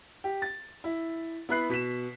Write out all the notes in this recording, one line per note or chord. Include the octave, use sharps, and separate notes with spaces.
G4
A6
E4
B3 E4 B5 F#6 C7
B2 B6 E7